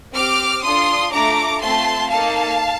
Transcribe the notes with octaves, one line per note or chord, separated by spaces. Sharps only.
C4 G4 D6 F6
D4 F4 A4 C6 D#6
A3 D4 F4 A4 A#5 D6
A3 C4 F4 A5 C6
A#3 D#4 A4 F5 A5